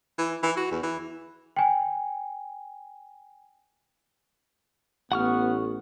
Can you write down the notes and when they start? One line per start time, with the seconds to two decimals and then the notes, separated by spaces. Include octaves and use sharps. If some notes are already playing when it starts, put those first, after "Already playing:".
0.18 E3
0.43 E3
0.57 F#4
0.71 E2
0.83 E3
1.57 G5 G#5
5.12 A1 B3 F#5 C#6 F6